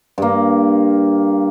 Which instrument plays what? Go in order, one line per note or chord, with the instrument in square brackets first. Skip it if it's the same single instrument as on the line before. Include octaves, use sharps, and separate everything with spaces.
[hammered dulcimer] G2 A#3